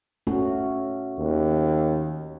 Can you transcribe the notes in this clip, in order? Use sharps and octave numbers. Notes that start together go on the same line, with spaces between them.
A3 C#4 F#4
D#2